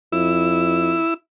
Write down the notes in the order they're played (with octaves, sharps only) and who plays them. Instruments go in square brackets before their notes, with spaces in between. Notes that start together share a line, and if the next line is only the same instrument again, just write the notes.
[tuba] F2 [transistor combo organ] E4 E6